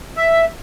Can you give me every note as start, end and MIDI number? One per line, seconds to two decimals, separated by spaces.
0.17 0.45 76